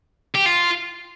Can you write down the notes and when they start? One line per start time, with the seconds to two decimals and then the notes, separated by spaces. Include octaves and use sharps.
0.35 G4
0.46 F4